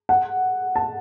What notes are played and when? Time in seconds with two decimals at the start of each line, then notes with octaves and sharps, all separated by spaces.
0.09 F#5
0.76 A5